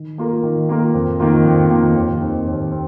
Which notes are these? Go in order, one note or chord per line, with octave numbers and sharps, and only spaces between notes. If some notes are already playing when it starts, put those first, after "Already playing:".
Already playing: D#3
A#3 F4 A#4
D#3
A#3 F4 A#4
F2
D#3 A#3 F4
F2
D#3 A#3 F4
D#2
D#3 C4
D#2
C4